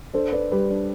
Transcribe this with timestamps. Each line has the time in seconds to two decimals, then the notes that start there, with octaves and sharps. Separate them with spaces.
0.13 D4 A4 C5
0.33 D4 B4 D5
0.52 G3 G4 B4
0.70 D4